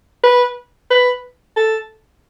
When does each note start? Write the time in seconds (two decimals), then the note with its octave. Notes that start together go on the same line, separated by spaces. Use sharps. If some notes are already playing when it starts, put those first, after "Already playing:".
0.24 B4
0.91 B4
1.57 A4